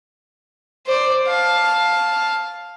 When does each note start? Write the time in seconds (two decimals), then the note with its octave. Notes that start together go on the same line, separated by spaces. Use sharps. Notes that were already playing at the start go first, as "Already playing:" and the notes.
0.87 C5 D5
1.28 F5 A5